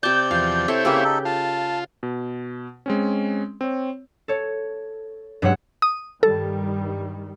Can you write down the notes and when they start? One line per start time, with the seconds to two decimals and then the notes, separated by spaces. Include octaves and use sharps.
0.03 C3 D5 A5 G6
0.31 E2 F3 F5
0.68 C4 E4 A4 C#5
0.85 C#3 A#3 G4 B4 E5
1.04 D#4 A4
1.25 F4 A5
2.03 B2
2.86 G#3 C4 C#4
3.61 C4 C#5
4.28 A4 C#5
5.42 G2 F#3 G#3 C#5 F#5 E6
5.82 D#6
6.23 G2 D#3 G3 A4